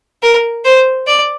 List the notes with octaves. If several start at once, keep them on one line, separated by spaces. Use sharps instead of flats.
A#4
C5
D5